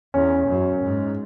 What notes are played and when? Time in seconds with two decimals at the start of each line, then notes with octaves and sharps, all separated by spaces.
0.14 E2 C#4
0.48 F#2
0.82 G#2